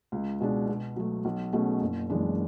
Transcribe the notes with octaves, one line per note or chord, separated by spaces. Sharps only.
C#2
B2 G#3 D4
B2
F#3 A3
B1
B2 A3 C#4 G#4
F#1
F#2 E3 G#3 D4